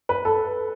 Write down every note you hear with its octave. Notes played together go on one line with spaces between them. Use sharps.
B4
A4